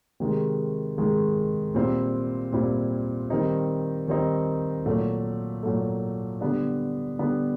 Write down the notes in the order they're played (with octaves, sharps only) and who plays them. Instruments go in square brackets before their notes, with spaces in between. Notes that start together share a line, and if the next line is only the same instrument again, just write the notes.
[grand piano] C3 D#3 G#3
C3 D#3 G#3
A#2 G3 C4 E4
A#2 G3 C4 E4
D#3 G3 C4 D#4
D#3 G3 C4 D#4
A#2 F#3 A3
A#2 F#3 A3
D3 G3 B3 D4
D3 G3 B3 D4